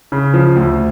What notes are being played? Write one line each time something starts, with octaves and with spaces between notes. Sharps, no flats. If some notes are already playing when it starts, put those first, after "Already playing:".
C#3
F3
D2